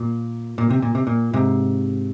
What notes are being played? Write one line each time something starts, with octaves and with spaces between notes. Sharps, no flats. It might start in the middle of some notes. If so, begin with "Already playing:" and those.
Already playing: A#2
A#2
C3
A#2
C3
A#2
G#2 C3